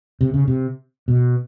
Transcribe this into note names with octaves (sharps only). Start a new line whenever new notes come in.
C3
C#3
C3
B2